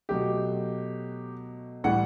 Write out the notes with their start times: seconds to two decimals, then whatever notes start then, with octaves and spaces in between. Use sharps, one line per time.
0.09 B2 F#3 A3 G4
1.84 A2 E3 G3 F#5